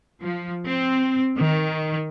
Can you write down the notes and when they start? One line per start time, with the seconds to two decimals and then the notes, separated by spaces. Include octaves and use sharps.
0.21 F3
0.65 C4
1.36 D#3